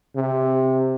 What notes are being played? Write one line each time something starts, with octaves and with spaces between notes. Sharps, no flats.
C3